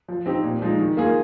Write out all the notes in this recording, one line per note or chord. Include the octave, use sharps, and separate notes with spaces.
F3
C4 D#4 G4
A#2
F3 G#3 D#4
D#3
A#3 F4 G#4